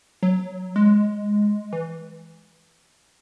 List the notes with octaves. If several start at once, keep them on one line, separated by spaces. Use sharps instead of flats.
F#3
G#3
E3